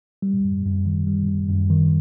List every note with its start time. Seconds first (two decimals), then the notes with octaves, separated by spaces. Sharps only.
0.22 G3
0.44 F#2
0.65 F#2
0.86 D#3
1.07 G3
1.29 F#2
1.50 F#2
1.70 D#3